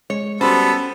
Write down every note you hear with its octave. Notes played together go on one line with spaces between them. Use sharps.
G#3 C#5
G3 B3 C#4 F#4 A4 C5 B5 A6